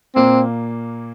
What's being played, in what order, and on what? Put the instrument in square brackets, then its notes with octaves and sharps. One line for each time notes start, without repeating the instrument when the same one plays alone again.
[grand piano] A#2 A#3 [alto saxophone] C4